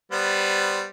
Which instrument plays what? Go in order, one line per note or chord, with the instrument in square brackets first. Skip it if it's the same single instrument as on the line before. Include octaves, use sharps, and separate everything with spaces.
[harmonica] G3 B3 C5